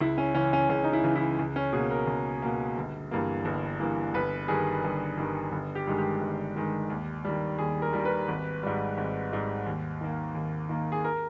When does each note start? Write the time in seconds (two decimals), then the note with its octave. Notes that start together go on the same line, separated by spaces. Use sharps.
0.01 C#2 E4
0.18 C#4
0.35 C#3 E3 C#4
0.53 C#4
0.69 C#2 C#4
0.84 D#4
0.93 E4
1.04 C#3 E3
1.16 E4
1.39 C#2
1.56 C#4
1.73 B2 A#3 G#4
1.91 A#4
2.07 C#2
2.42 B2 A#3
2.77 G1
3.11 G2 E3 A#3
3.45 G1
3.80 G2 E3 A#3
4.14 G1 B4
4.48 G2 D#3 G#4
4.84 G1
5.18 G2 D#3
5.52 G1
5.75 G4
5.87 G2 D#3 G#3
5.98 G4
6.21 G1
6.56 G2 D#3 G#3
6.90 D#2
7.25 D#3 G3
7.59 D#2 G#4
7.82 A#4
7.93 D#3 G3
8.05 B4
8.28 G#1
8.63 G#2 G3
8.98 G#1
9.32 G#2 G3
9.66 D#2
10.01 D#3 A#3
10.35 D#2
10.69 D#3 A#3
10.92 G#4
11.04 A#4